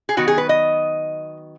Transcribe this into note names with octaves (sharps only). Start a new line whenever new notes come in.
G#4
D#3 F#3 B3 F#4
G#4
B4
D#5